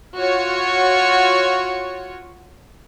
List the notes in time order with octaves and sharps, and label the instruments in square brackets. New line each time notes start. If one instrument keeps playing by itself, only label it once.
[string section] F4 F#4 C#5